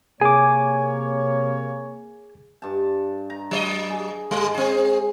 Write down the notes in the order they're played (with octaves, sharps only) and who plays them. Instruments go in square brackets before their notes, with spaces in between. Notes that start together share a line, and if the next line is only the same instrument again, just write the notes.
[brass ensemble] C3 A#3 C#5 [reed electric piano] G#4 [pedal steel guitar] G#5 D6
[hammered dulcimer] G2 A5
A#5
[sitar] F#3 D5 D#5
[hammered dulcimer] G#4
[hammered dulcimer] G#2 [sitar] G3
[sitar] C4 G#4